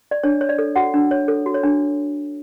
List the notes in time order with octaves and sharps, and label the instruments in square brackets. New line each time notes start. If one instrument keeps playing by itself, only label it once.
[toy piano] D5
D4 C#5
C#5
D5
A4
F#4 F#5
D4
C#5
A4
F#4
C#5
D4